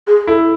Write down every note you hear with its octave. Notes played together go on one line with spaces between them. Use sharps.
G#4
E4 A4